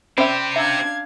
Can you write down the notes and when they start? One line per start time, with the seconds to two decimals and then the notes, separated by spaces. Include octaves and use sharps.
0.18 C4 C#4 G4 C5 D5 E5 B5
0.52 D4 E5 F5 A#5 G#6 C#7